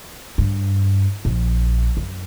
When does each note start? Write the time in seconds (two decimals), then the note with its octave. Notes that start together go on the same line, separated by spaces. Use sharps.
0.38 G2
1.25 A#1
1.97 F#2